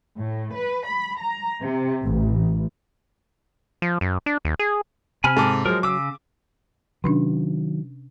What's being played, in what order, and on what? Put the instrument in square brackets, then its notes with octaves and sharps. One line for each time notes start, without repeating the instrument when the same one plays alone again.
[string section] A2
B4
B5
A#5
C3
A1
[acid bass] F3
F#2
D4
D#2
G#4
[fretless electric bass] C3 C4 [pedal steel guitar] G#5 B5 F6
[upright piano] G#2 A4 D6
[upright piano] F3 G#3 [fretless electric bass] F#3 [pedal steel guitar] A#4
[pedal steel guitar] C#3 E6 [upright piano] D6
[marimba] C3 C#4 D4 [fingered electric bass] D#3 F#3